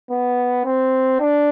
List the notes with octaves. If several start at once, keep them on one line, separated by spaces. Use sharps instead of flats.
B3
C4
D4